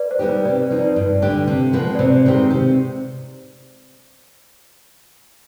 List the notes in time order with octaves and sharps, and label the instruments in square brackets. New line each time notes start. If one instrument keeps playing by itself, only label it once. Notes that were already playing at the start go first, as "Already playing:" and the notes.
Already playing: [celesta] B4 D5
C5
[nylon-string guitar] G3 B3 D#4 G4
[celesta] B4
[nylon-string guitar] C3 [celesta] B4 D5
[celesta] B4 D5
[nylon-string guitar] F3 C4 D#4
[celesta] B4 D5
[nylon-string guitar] G2
D3 G3 D4 G4
C3
F3 G#3 B3
[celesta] D5
[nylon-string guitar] C3 [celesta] C5
[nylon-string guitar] D#3 G#3 C4 G4
C3